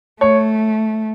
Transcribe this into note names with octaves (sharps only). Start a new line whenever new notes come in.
A3 C#5